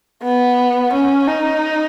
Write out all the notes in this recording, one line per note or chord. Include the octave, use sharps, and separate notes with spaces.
B3
C#4
D#4